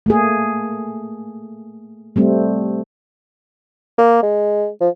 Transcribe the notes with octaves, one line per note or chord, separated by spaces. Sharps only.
A3 A#3 G#4
G3 A3 C4
A#3
G#3
F3